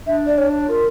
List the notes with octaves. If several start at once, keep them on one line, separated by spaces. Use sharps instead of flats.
D4 E5
D5
C#5
F4 A#4